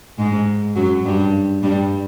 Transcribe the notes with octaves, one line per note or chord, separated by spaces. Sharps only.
G#2 G#3
F#2 F#3
G2 G3
G2 G3